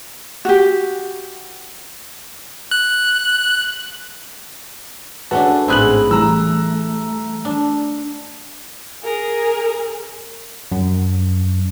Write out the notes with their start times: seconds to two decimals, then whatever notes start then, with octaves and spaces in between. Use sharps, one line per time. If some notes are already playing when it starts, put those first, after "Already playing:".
0.45 F#4 G4
2.71 F#6
5.31 A3 C#4 D4 F#4 B4 A5
5.68 A1 G#2 C4 E4 G#4 G#5 F#6 F#7
6.11 E3 G3 A3 A#5 E6
7.45 D4
9.04 G#4 A#4
10.72 F#2